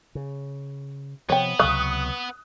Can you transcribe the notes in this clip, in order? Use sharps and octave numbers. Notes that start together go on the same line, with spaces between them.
C#3
C3 F3 B3 C#5 G5
C#2 C3 F#3 F5 C#6 D#6 F#6